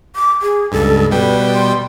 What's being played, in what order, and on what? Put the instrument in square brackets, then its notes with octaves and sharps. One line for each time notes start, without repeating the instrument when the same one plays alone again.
[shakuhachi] D6
G#4
[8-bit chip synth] C#2 G2 [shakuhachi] A4
[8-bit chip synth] B2 G3 G5 [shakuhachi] B4
[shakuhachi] C6